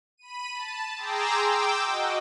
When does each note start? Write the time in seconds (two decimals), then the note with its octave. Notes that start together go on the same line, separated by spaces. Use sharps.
0.18 B5 D#7
0.53 A5
0.96 G#4 G5 A#5 C6 D6 E6
1.47 G5 D6 E6
1.85 F#4 D#5